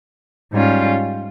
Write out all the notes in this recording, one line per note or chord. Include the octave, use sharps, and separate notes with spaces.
G#2 G3 C#4 F4